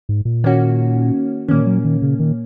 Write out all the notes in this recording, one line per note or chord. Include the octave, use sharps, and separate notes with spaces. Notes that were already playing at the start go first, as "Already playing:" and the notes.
G#2
A#2
D#3 A#3 C#4 F#4
A#2 D#3 A#3 C#4
F#3
D#3
C#3
D#3